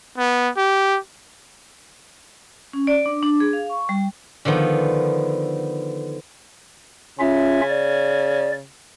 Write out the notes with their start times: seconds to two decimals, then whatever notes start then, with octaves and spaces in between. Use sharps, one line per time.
0.18 B3
0.57 G4
2.73 C#4
2.87 D5
3.06 D4
3.23 D4
3.40 G#4
3.53 F5
3.70 C#6
3.89 G3
4.45 D3 D#3 F3 B3
7.20 C#3 C#4 F4 E5
7.69 D5